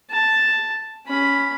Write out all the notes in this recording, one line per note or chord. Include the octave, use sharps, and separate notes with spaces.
A5
C#4 B5